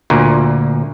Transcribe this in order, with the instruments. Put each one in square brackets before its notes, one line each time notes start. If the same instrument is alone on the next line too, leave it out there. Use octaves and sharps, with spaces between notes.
[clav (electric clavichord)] D2 A#2